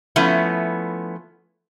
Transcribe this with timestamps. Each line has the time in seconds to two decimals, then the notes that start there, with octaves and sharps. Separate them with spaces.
0.16 F3 A3 B3 C#4 E4